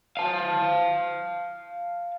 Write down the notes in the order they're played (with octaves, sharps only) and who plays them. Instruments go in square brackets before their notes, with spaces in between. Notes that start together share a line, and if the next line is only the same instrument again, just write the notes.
[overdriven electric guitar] F5 A5